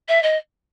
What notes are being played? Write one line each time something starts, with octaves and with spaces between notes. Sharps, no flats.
E5
D#5